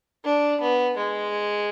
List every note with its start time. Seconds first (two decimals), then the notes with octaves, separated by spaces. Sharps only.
0.25 D4
0.61 B3
0.97 G#3